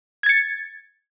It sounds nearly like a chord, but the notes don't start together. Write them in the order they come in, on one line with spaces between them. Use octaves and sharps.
G#6 A6 C#7